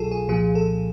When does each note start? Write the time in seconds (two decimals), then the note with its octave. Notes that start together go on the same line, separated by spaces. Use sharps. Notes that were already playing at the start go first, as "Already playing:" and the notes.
Already playing: C2 B2 F#3 F4 G#4 A4
0.11 G#4
0.28 C2 A#2 F3 G#4
0.55 A4